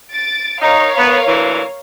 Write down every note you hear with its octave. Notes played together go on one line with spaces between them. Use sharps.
A6 D7
D#4 A#4 C#5 F5
B3
D2 A#2 E3